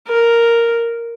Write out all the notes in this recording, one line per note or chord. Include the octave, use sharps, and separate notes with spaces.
A#4